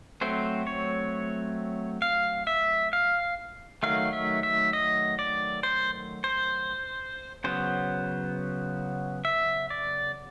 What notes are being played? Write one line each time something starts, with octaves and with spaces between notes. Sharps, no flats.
F#3 A3 C4 C5
C#5
F5
E5
F5
D#3 F#3 A3 F5
E5
E5
D#5
D5
C5
C5
C#3 F#3 B3 C5
E5
D5